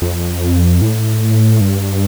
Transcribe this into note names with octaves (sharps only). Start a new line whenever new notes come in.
F2
A2
G2